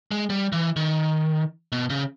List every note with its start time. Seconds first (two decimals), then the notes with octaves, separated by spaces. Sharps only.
0.11 G#3
0.30 G3
0.53 E3
0.76 D#3
1.72 B2
1.90 C#3